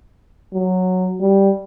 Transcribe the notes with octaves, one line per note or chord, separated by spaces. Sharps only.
F#3
G3